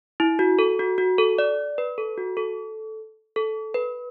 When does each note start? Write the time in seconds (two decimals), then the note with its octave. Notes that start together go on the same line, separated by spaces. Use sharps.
0.20 E4
0.39 F#4
0.59 A4
0.79 F#4
0.98 F#4
1.18 A4
1.39 D5
1.78 B4
1.98 A4
2.18 F#4
2.37 A4
3.36 A4
3.74 B4